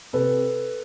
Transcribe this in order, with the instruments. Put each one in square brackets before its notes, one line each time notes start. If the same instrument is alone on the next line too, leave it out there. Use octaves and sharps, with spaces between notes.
[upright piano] C3 A4 B4